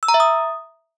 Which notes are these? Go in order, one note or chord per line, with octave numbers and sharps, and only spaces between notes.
E6
A#5
E5
D#6